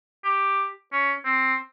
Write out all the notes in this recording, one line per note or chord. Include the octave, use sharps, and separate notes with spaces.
G4
C#4
C4